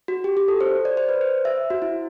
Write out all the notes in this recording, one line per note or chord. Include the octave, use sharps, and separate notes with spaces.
F#4
G4
G4
A4
C5
D5
C5
B4
C5
E5
F#4
E4